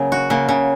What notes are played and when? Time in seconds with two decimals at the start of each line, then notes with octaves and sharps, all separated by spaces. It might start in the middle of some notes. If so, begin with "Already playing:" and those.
Already playing: C#3 F#3 A#3 C#4
0.12 F#4
0.30 C#3 A#3
0.49 C#3